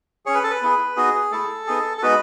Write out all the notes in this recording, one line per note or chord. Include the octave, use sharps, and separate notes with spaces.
C#4 G#4 C#5
B4
A4
B4
B3 E4 G#4
B3 D#4 F#4 G#4
A3 E4 G#4 A4
B3 D#4 G#4
A4
G#3 B3 D#4 F#4 B4